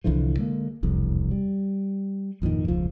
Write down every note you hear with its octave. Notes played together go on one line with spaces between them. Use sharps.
C2 D3 E3 F3
D3 G#3 A#3
E1 C2 F2
G3
G#1 F2 A#2 D#3
E1 C#2 F3